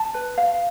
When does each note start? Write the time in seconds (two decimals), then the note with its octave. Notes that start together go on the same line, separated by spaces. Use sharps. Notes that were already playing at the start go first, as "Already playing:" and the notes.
Already playing: A5
0.14 B4
0.38 F5